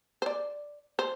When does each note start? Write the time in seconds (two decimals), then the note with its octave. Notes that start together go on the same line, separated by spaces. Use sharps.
0.22 C5
0.26 D5
0.99 C5